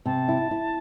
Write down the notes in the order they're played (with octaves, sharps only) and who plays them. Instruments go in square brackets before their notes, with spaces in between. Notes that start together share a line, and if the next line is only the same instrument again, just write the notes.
[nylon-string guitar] C3 [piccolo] A5
[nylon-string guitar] E4
E4